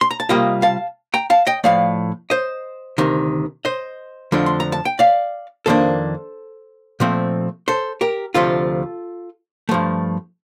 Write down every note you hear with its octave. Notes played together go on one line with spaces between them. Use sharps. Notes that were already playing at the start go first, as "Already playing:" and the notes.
C6
A#5
A5
C3 G3 A#3 F4 D#5 G5
F5 A5
G5 A#5
F5 A5
D#5 G5
A2 F3 A3 D5 F5
C5 D#5
D2 C3 D#3
C5 D#5
F2 D3 F3 A3 D4
C6
A#5
A5
G5
D5 F5
F2 D#3 A#3 D4 A4 C5
A#2 F3 A3 C4
A4 C5
G4 A#4
D2 C3 F3 A3 F4 A4
G2 F3 A3